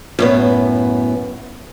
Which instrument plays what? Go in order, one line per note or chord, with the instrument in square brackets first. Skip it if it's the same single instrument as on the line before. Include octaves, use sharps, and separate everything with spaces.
[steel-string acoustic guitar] F#2 A2 B3